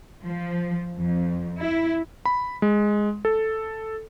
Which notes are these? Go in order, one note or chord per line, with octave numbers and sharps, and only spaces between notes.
F3
F2
E4
B5
G#3
A4